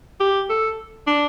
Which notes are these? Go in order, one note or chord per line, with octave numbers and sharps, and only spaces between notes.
G4
A4
D4